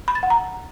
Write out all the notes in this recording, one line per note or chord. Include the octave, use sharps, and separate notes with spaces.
B5
A6
F#5
A#5